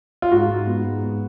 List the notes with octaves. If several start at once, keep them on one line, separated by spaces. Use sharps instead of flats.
F4
G#2 F#4
G#2
B3
G#2
B3